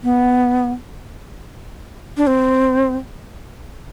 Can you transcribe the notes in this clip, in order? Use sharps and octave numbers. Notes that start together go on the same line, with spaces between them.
B3
D4
C4